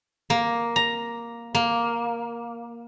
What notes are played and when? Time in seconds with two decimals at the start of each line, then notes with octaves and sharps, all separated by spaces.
0.30 A#3
0.76 A#5
1.55 A#3